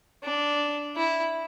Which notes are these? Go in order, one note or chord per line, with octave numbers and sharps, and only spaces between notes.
D4
E4